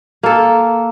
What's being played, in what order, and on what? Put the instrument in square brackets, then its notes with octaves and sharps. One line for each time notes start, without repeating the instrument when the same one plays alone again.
[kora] A#3 A4